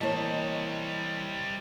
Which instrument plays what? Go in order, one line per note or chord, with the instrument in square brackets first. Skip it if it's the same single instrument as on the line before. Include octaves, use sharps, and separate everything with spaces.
[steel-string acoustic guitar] E3 A#3 C#5 [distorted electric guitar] G3 C5 [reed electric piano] D#5 A5